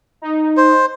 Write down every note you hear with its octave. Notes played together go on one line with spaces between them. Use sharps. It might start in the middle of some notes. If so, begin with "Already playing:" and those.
D#4
C5